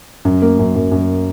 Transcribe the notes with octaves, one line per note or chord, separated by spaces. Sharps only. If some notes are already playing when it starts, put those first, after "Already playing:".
F#2
A#3
F#2
F#2
F#2